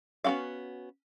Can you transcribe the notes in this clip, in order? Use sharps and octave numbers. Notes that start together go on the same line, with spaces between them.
B3 C#4 F4 F#4 F5